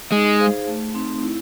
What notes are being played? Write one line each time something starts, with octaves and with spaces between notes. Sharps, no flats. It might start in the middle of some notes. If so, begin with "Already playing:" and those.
G#3 D#4
G#4 C5 F5
A3
C4 D#4
E4